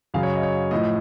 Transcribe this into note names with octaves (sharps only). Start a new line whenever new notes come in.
F#2 C#3 F#3 F5
C#5
D#5
C#5
A2 F3 D#5